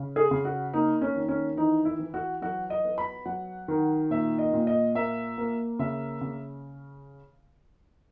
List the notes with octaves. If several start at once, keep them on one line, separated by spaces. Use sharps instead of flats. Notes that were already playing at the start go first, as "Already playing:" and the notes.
Already playing: C#3
G#4
C#3
F#4
A#3 D#4
C#4
D#3
C#4
E3 D#4
E4
E3
F#4
F#3 F#4
D#5
B3
B5
F#3 F#5
D#3
A#2 E5
D#5
A#2
D#5
A#3 E5
A#3
C#3 E5
C#3